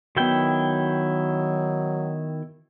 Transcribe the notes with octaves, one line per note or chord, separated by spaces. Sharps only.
D#3 F#3 B3 E4 F#4 G5